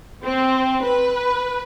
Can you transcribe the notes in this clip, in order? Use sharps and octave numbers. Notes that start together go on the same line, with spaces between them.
C4
B4